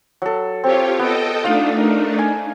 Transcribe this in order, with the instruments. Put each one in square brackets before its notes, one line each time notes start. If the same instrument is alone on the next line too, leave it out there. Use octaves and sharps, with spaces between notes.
[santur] F#3 A4
[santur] C4 [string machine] F4 G4 C#5
[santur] B3 [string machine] A4 D#5 G5
[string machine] A3 D4 D#4 [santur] F4 F5
[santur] A#4
G#5